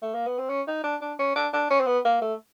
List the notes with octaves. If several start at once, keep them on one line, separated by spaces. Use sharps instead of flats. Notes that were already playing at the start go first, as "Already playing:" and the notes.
A3
A#3
B3
C4
C#4
D#4
D4
D4
C#4
D4
D4
C#4
C4
B3
A#3
A3